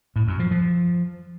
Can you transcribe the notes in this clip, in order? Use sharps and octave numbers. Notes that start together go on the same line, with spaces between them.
A2
F#2
F3
F3